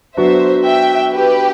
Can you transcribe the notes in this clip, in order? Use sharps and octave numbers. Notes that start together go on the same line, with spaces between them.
F#3 B3 D4 F#4 C5 E5
E5 G5
G4 B4